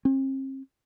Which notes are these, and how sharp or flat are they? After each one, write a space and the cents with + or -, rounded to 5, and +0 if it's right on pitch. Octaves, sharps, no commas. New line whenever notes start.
C4 +40